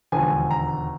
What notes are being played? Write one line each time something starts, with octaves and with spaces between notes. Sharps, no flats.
E1 D#2 D3 F3 G#5
A#5